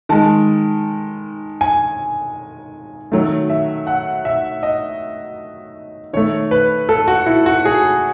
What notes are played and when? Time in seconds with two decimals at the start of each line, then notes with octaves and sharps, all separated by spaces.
0.09 D#3 G#3 A5
1.61 G#5
3.12 D#3 F#3 A3
3.50 E5
3.87 F#5
4.25 E5
4.63 D#5
6.13 D#3 A3 C#5
6.51 B4
6.89 A4
7.08 F#4
7.26 E4
7.46 F#4
7.65 G#4